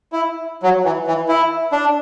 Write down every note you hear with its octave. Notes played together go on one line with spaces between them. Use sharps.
E4
F#3
E3
E3
E4
D4